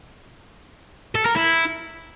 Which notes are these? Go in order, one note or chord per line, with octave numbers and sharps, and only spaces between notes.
A4
A#4
E4